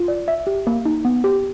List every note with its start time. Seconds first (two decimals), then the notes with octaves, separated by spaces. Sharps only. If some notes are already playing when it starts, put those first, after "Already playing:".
Already playing: F4
0.08 D5
0.28 E5
0.47 G4
0.67 A#3
0.85 D#4
1.05 B3
1.24 G4